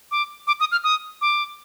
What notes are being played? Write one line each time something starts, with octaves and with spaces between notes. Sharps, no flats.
D6
D6
D#6
F6
D#6
D6